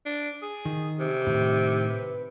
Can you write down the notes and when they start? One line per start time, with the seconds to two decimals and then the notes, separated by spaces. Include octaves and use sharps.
0.06 D4
0.42 G#4
0.65 D#3
0.99 C3
1.27 A2 D#3
1.90 B4